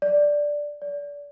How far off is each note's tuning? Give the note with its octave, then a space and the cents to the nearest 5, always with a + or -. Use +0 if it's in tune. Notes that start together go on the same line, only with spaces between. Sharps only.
D5 +0
D5 -25